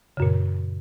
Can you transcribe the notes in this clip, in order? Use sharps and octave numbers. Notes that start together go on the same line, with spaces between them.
F#2 A#2 C#3